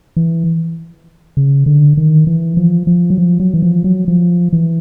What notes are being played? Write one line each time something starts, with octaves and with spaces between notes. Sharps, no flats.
E3
C#3
D3
D#3
E3
F3
F3
F#3
F3
F#3
E3
F3
F#3
F3
E3